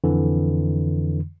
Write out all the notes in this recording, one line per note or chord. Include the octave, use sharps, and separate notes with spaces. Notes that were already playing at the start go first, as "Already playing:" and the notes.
F2 D3 E3